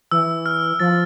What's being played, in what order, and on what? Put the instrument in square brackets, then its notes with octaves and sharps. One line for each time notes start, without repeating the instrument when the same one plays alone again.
[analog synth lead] E3 [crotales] E6
[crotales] F6
[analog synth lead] F3 [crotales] A6